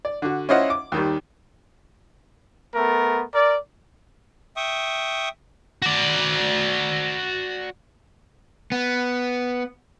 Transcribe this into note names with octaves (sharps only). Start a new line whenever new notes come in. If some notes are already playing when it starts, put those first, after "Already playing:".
D5
D3 F#4
C#4 E4 F4 C5 D#5 F#5
D6
D#2 D#3 G3
A3 B3 A#4
A#4 D5
E5 G5 C#6 D#6
F#4 D5
B3